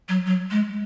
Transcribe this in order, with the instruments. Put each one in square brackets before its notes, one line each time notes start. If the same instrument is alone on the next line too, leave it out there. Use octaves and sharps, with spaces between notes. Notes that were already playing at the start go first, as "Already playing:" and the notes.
[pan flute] F#3
F#3
G#3